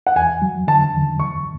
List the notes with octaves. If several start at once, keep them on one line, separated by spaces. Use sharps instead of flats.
F#5
E2 G#5
F#3
D3 A5
E2
D2 C#6